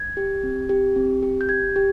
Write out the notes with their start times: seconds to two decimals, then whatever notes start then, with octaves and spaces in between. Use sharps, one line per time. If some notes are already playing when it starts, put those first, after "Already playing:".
Already playing: G#6
0.17 G4
0.43 C4
0.69 G4
0.96 C4
1.23 G4
1.41 G6
1.49 G4 G#6
1.76 G4